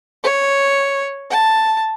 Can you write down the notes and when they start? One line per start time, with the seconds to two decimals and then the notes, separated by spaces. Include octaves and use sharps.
0.23 C#5
1.30 A5